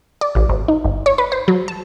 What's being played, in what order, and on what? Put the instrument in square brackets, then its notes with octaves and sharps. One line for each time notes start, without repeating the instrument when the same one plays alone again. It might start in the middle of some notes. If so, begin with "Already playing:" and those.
[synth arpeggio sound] D5
A1
G#1
D#4
G1
C#5
B4
C5
F#3
A5